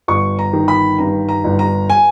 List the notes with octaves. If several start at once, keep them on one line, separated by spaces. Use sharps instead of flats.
G1 C#6
A#5
D#3
B5
G2 A#5
A#5
G1
A#5
G#5